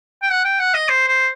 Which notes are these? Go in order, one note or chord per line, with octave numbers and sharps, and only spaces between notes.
G5
F#5
G5
F#5
D#5
C5
C5